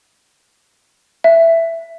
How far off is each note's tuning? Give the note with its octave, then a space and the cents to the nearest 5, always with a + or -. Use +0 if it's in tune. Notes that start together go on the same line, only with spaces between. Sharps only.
E5 +10